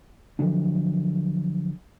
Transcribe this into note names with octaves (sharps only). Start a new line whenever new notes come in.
D3 F3 F#3 D4